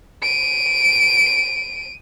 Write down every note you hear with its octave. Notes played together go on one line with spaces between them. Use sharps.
D7 D#7